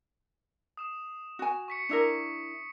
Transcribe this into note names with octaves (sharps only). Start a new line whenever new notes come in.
D#6 E7
F#4 G#5
C#6 B6 C#7
D4 E4 A#4 C#7